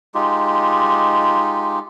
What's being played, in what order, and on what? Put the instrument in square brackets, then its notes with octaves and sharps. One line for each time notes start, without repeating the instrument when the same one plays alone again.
[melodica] G#3 D#4 F4 G4